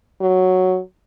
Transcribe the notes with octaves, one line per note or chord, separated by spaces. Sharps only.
F#3